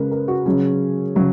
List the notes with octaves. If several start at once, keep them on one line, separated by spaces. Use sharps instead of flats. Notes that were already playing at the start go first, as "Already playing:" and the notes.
Already playing: C#3 G#3 C#4 A#4 B4
A#4
F#4
C#3 F#3 C#4 G#4
C#3 F#3 C#4